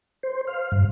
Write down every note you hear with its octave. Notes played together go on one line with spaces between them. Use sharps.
C5
F5
G2